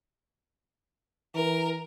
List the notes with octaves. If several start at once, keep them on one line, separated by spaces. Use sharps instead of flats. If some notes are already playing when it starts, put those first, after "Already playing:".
E3 A#4